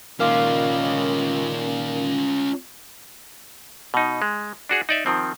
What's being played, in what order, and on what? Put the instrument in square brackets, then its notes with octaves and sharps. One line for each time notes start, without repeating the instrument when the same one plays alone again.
[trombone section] A#2 D#3 [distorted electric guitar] C#4 F4 [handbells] A#4 F5 D6
[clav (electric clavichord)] B2 D#4
G#3
D4 F#4 G#4
D#4 D5 E5
D#3 F3 C4